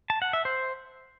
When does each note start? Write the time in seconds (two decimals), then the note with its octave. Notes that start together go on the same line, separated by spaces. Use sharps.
0.10 A5
0.22 F#5
0.33 E5
0.45 C5